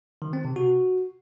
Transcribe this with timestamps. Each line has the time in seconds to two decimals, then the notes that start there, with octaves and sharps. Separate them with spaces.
0.22 D#3
0.33 C4
0.45 C3
0.56 F#4